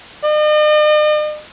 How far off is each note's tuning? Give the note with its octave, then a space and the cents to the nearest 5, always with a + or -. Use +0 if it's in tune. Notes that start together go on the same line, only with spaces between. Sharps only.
D#5 -45